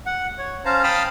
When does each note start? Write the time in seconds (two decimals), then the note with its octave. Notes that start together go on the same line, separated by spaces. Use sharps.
0.06 F#5
0.38 C#5
0.65 C#4 C5 F5 A5 A#5
0.83 F5 G5 A5 B5 D#6 F6